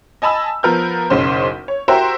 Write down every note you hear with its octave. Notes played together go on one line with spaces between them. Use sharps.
D#5 G#5 A5 B5 E6
F3 B3 A#4 F6 G6
F#1 B1 C#3 C5 C6
C#5
F#4 G4 A#4 C5 E5 G5